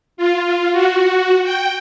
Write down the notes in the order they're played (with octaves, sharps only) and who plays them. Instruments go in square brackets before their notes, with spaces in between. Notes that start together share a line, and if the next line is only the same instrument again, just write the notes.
[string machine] F4
F#4
F#4
G5